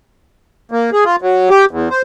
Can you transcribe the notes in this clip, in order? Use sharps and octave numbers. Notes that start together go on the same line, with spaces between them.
A#3
G#4
F4
F#3
G4
E2
C5